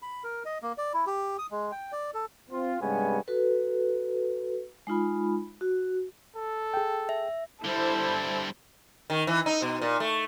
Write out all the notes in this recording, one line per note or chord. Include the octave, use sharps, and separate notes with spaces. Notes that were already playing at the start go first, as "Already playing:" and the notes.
B5
A#4
D#5
A#3
D5
E4
G4
D#6
G#3
G5
D5
A4
C4 F4
G2 C3 G#3 B3 C#4 G#5
F#4 A4 B4
G#3 D#4 F4 B5
F#4
A4
G#4 G5
E5
D3 G3 E4 A4 C5
D#3
E3
D#4
B2
A#2
A3